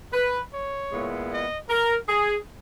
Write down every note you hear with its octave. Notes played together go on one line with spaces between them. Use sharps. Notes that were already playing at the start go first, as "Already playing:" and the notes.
B4
C#5
A#2 G#3 B3 E4
D#5
A#4
G#4